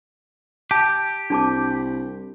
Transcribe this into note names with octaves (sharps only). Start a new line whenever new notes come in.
G4 A5
C2 D4 A5 D6